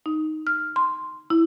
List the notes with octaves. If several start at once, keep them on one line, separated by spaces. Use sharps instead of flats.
D#4
F6
C6
E4